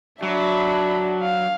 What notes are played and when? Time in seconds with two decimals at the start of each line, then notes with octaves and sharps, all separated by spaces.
0.23 F#3 D4 F#4 E5 B5
1.22 F5